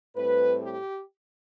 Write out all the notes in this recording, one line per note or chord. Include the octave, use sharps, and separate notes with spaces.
A2 G3 C4 B4
G4